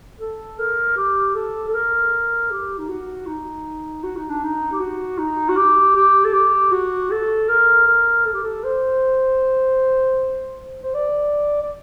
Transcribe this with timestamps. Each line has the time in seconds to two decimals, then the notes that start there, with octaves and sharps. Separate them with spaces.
0.20 A4
0.58 A#4
0.96 G4
1.35 A4
1.68 A4
1.74 A#4
2.51 G4
2.79 D#4
2.89 F#4
3.26 D#4
4.04 F#4
4.17 D#4
4.29 D4
4.43 D#4
4.72 G4
4.80 F#4
5.18 D#4
5.49 F#4
5.56 G4
5.95 G4
6.24 A4
6.33 G4
6.72 F#4
7.10 A4
7.49 A#4
7.86 A#4
8.25 A4
8.34 G4
8.43 A4
8.64 C5
10.83 C5
10.94 D5
11.61 D5